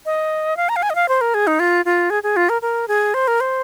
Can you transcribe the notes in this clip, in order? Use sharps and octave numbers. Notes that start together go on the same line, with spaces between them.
D#5
F5
A#5
F5
G#5
D#5
F5
C5
A#4
G#4
D#4
F4
F4
G#4
G#4
F4
A#4
A#4
G#4
C5
A#4
C5